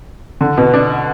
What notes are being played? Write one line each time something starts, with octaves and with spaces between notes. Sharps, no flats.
D3
B2
D4